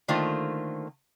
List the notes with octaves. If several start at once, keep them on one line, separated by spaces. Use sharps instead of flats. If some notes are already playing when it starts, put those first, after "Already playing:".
D3 D#3 A3 A#3 F4 C5